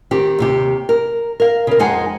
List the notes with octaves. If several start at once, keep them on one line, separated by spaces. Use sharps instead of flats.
D#3 C4 G4
D#2 C3 G4
A#4
A#4 F5
C#3 A#4
F2 G#3 D#4 C5 F#5 G#5